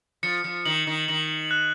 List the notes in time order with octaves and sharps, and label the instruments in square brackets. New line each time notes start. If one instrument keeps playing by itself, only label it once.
[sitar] F3 [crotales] C#7
[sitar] F3
[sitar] D#3 [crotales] F#7
[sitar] D#3
[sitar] D#3 [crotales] F#7
[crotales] F#6